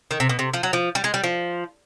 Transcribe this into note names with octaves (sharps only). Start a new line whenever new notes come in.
D#3
C3
B2
C3
F3
F#3
F3
G3
G#3
G3
F3